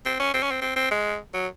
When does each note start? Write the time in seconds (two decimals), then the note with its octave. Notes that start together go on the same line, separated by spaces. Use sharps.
0.05 C4
0.19 C#4
0.33 C4
0.42 C#4
0.51 C4
0.61 C4
0.76 C4
0.91 G#3
1.34 F#3